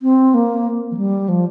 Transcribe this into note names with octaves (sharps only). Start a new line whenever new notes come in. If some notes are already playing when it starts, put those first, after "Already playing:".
C4
A#3
F3
G3
F3